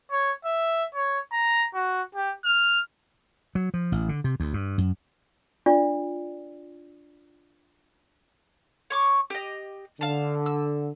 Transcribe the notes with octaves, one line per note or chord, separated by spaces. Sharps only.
C#5
E5
C#5
A#5
F#4
G4
F6
F#3
F3
A1
D3
C3
D2
G2
F#2
D4 F4 D5
C#5 C#6 D6
G4 D#5
D3 F5 A5
E6